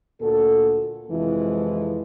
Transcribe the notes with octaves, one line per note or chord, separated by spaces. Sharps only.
D2 A#2 F#4 A4
F2 C3 E3 F3 G#3 E4